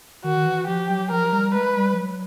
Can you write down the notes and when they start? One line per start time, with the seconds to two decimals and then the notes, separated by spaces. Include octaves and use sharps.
0.24 D#3 F#4
0.36 D#3
0.46 E3
0.67 F3 G4
0.90 F#3
1.11 F3 A#4
1.33 G3
1.54 G#3 B4
1.77 G3
1.94 F3
1.98 F#3